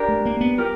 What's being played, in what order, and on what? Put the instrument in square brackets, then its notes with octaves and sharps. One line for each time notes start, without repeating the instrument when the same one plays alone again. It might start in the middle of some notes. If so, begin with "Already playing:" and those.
Already playing: [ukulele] D4 G4 A#4
[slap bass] A3
A#3
B3
[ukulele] G4 A#4